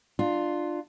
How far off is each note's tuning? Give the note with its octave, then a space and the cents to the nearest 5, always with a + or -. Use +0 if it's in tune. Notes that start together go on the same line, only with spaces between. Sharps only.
D4 +25 F4 +0